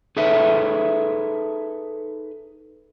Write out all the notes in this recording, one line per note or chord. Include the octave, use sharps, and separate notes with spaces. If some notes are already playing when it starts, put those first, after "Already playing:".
D#4 G#4 A4 B4 E5